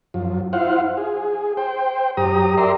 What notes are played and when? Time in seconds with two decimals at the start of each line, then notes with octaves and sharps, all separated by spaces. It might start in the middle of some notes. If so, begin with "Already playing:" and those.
0.14 F#2 F3
0.53 E4 F4 C5 F5 F#5
0.97 G#4
1.57 C5 G5
2.17 F#2 G4 A#5 D#6
2.57 G4 A#4 D5 E5 A#5 C6